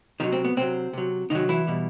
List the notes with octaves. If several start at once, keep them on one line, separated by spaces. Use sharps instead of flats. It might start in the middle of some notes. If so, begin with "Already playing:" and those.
C3 D#3 F#3 D#4
C4
B3
C3 F#3 C4
C3 F#3
C3 D#3 F#3 D#4
E3 E4
B2 G3